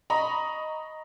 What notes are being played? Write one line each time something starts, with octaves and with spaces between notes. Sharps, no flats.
D#5 A#5 B5 C#6 D#6